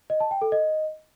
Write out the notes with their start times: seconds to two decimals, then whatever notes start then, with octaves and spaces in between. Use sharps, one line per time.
0.10 D#5
0.20 A5
0.31 G5
0.42 A4
0.52 D#5